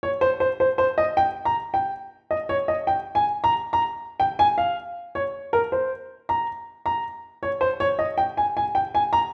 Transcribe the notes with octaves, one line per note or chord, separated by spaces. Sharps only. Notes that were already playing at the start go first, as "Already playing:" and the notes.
C#5
C5
C5
C5
C5
D#5
G5
A#5
G5
D#5
C#5
D#5
G5
G#5
A#5
A#5
G5
G#5
F5
C#5
A#4
C5
A#5
A#5
C#5
C5
C#5
D#5
G5
G#5
G#5
G5
G#5
A#5